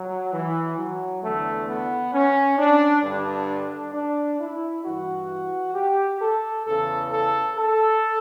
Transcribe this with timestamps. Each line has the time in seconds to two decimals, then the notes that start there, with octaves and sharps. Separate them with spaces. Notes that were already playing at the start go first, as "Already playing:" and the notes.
Already playing: F#3
0.32 E3
0.77 F#3
1.22 E2 D3 A3
1.68 B3
2.13 C#4
2.58 D4
3.03 G2 D3 D4
3.94 D4
4.40 E4
4.85 G2 E3 F#4
5.75 G4
6.21 A4
6.66 E2 C#3 E3 A4
7.11 A4
7.56 A4